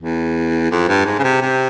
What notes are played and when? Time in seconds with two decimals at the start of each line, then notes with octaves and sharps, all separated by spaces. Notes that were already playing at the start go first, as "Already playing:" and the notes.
0.01 E2
0.71 F2
0.88 G2
1.05 G#2
1.19 C#3
1.23 C3
1.41 C3